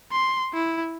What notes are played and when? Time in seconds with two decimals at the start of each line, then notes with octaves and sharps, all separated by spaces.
0.12 C6
0.53 E4